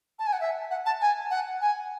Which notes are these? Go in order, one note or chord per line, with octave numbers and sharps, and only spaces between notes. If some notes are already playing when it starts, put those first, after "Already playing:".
A5
G#5
F#5
E5
F#5
A5
G#5
F#5
G#5